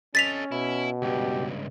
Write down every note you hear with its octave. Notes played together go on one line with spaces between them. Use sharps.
C#4 A4 D#5 A6 B6 F7
B2 E4
C#2 G2 G4